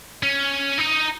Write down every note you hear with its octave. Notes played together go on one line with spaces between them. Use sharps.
C#4
D#4